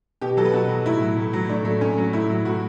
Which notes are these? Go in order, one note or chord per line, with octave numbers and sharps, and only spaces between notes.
B2 G4
F#3 A4
B4
B2 F#4
F#3
A2 E4
F#3
A2
F#3
A2 D4
F#3 A3
A2 C#4
F#3
A2 E4
F#3
A2 F#4